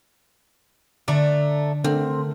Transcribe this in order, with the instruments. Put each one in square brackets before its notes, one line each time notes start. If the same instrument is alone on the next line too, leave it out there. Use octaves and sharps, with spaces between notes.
[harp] D3 [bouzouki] A3 D4 A#5
[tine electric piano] D3 [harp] A3 A#4 F6 [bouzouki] C4